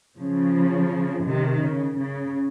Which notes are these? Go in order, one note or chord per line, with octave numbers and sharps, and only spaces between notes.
C#3 F3
C3 D#3
C#3
C#3